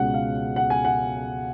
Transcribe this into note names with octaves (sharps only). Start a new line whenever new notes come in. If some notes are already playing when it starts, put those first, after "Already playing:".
Already playing: C#2 B2 G#3 C#4 F#5
F5
F#5
G#5
F#5